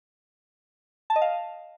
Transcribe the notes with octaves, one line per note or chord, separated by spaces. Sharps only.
A5
D#5
F5